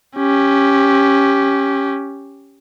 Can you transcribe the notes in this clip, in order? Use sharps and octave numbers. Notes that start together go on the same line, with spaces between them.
C#4 G4